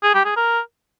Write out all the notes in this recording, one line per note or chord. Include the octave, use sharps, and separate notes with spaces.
G#4
G4
G#4
A#4